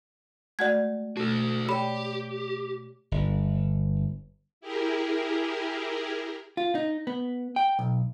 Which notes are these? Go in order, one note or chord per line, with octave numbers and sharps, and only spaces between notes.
G#3 A3 F#4 D5 F#5 G#6
B2 A3 F#4 A4
G4 C#5 D5 G5 B5
G1
E4 G4 G#4 A#4
F4
D#4
B3
G5
B1